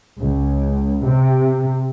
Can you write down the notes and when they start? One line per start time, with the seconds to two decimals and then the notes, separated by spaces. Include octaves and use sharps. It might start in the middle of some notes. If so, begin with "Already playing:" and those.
0.20 C#2
1.04 C3